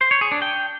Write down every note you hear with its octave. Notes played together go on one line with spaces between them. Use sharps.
C5
C#5
G#4
D4
G5